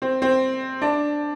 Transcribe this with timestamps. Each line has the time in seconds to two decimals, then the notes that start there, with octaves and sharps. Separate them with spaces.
0.02 C4
0.22 C4
0.82 D4